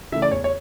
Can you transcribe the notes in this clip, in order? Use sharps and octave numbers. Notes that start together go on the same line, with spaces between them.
C#3 E3 A3 E5
D5
E2 C#5
C#5